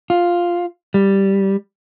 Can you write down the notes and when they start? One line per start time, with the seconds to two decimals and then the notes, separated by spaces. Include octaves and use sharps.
0.10 F4
0.94 G3